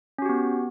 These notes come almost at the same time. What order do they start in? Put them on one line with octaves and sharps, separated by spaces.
C#4 F#4 G4 B3